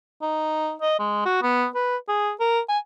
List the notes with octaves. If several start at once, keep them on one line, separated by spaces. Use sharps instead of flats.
D#4
D#5
G#3
F#4
B3
B4
G#4
A#4
G#5